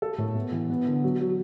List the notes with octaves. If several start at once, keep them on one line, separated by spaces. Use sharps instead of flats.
A4
A2
B3
E3
B3
D3
F#3
F#3